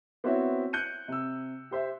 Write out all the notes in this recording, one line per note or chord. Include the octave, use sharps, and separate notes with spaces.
B3 C4 E4 F#4 C#5 E5
F#6 G6 C#7 D#7
C3 E6
G4 C5 E5